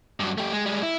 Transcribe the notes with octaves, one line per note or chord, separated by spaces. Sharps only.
G2 F#3
A3 G4
G#3
G3 G#3
E4